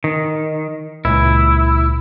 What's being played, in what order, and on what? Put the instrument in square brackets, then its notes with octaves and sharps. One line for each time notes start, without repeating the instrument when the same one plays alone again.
[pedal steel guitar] D#3
[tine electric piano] C#2 A#2 [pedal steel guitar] E4